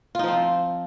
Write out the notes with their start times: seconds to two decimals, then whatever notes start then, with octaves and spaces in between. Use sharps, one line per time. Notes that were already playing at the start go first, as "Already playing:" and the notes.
0.15 F4
0.19 D#4
0.24 F3
0.28 C4